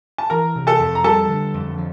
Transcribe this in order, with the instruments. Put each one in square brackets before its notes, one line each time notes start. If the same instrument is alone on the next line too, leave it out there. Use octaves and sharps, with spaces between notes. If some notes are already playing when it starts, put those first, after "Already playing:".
[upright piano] A5
[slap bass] E3 [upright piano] A#4 A#5
[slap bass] C3
[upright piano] A4 A5
[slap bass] F2
[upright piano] A#5
[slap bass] G3 [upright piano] A4 A5
[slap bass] D3
F2
F3